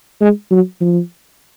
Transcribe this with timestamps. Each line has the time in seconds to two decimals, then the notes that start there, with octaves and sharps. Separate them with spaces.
0.21 G#3
0.51 F#3
0.81 F3